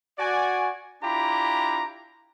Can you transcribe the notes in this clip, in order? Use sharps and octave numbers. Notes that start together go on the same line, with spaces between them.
F#4 D5 G#5
D4 E4 F4 G4 A#5 B5